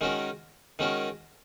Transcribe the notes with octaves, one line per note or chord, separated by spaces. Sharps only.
D#3 G#3 C#4 F#4 A#4
D#3 G#3 C#4 F#4 A#4